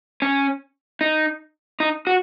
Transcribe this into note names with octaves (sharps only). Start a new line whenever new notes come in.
C#4
D#4
D#4
F#4